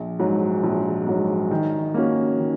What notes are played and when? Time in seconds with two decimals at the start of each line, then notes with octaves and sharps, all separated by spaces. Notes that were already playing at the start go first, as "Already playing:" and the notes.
Already playing: A#1
0.19 G#2 F#3
0.63 A#1
1.07 G#2 F#3
1.51 D#3
1.94 A#3 C#4 F#4
2.38 D#3